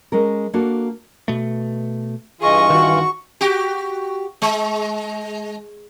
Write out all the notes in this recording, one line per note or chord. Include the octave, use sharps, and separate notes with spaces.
G#3 C#4 A#4
A#3 D4 F#4 A4
B2 A3
G2 E3 F4 G#4 D#5 C#6
D#3 F#4
F#4 G4
G#3